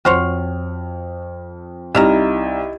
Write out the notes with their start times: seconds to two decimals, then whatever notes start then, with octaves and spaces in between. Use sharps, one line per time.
0.05 F2 F#4 C5 C#5 F6
1.95 C2 D#4 E4 E5 F5 A#5